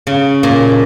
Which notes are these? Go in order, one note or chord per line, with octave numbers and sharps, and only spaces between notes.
C#3
A#2